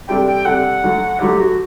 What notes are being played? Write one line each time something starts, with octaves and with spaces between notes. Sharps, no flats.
C3 G3 D4 A4 G5
G5
C3 G3 D4 A4 F#5
D3 F#3 A3
D3 F#3 A3 G4
F#4